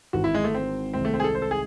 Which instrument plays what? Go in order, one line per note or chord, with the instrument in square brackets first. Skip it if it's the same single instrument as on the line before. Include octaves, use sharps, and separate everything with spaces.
[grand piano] G#1 G#2 E3 C4 [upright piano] F#4
[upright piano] E4
G#3
A3
C4
[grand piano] C2 C3 D#3 G#3 [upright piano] C4
[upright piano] A3
C4
G#4
A4
C5
A4
G#4